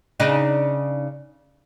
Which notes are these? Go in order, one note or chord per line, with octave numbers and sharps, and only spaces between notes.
C#3 D4 D#4